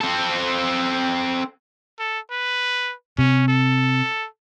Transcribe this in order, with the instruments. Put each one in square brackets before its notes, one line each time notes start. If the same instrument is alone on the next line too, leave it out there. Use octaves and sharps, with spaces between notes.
[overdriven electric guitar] C4 A4
[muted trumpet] A4
B4
[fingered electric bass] C3 [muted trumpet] C#4
[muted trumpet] A4